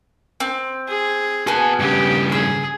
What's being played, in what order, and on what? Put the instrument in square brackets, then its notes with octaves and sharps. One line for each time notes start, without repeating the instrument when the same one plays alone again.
[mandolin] C4
[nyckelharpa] G#4
[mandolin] B3 G#5 [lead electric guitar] F#4 A5
[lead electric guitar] G2 C#3 [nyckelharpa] G4
[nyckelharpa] G#4 [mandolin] E6